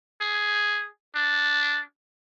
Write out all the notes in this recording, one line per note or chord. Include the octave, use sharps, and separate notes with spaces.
G#4
D4